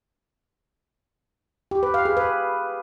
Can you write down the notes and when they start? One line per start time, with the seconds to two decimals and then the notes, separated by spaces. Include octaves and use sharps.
1.71 G4
1.83 B4
1.94 F5
2.05 G#4
2.17 B4